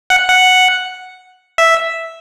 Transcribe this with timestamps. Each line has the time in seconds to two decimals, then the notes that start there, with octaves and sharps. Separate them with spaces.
0.10 F#5
0.28 F#5
1.58 E5